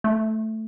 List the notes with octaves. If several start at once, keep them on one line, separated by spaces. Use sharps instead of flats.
A3